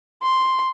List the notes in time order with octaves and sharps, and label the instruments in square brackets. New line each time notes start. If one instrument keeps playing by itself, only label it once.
[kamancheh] C6